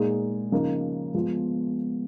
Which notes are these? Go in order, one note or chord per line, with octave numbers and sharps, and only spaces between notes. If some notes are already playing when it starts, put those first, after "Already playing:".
Already playing: A#2 G#3 D#4 G#4
C#3 F3 A#3 D#4
F3 G#3 B3 F4